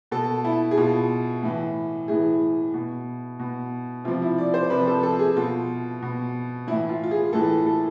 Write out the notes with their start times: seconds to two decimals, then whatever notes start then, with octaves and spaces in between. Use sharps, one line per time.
0.11 B2 A4
0.45 E4
0.71 G#4
0.77 B2 F4
1.42 A2 E3
2.08 A2 E3 G#4
2.74 B2
3.39 B2
4.04 C3 F4
4.08 F3
4.22 E4
4.38 D5
4.54 C5
4.70 C3 F3 B4
4.87 A4
5.03 A4
5.19 G#4
5.37 B2 F4
6.02 B2
6.67 E3 E4
6.71 A2
6.89 F4
7.04 F4
7.11 G#4
7.33 A2 E3 A4
7.66 A4